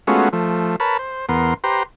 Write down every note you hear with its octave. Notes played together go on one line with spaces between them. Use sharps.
G#3 A3 B3 C#4 F4 F#4
F3 A3
A#4 B4 C#5 A5 B5
C5
E2 B3 A#4 C6
G4 B4 C5 A#5 C6